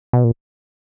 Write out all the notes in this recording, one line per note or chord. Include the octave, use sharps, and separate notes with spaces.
B2
A#2